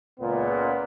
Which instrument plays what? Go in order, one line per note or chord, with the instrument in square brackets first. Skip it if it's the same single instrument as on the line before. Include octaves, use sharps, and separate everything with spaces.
[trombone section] C#2 A#2 [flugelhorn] B3